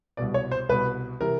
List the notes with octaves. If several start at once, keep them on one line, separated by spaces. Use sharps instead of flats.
C2 B2 D5
C#5
C5
C2 B2 B4
C3 E3 A#4